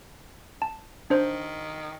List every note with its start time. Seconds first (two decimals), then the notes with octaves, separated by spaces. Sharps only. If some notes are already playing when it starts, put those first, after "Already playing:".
0.62 A5
1.10 D#3 D4 C5